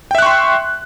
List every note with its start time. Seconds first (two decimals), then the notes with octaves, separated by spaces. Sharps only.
0.11 G5
0.15 E5
0.19 F#6
0.22 C#6
0.26 C6